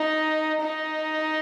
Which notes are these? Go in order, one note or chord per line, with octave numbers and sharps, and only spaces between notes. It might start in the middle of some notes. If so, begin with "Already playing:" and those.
Already playing: D#4
D#4